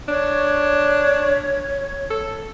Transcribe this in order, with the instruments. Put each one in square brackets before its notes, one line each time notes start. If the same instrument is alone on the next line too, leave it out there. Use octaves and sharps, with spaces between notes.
[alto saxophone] D4 [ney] C#5
[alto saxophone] A4